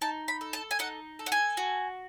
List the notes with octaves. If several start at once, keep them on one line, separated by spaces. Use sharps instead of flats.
D#4 A5
B5
A4
A5
G#5
D#4 F#5
A4
F#5
G#5
F#4